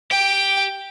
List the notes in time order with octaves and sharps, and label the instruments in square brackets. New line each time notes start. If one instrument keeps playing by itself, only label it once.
[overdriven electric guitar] G4 [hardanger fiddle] G5